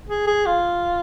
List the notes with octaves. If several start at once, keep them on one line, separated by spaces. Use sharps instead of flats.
G#4
G#4
F4